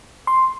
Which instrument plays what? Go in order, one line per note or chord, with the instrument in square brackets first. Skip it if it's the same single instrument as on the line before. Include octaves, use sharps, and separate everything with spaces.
[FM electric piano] C6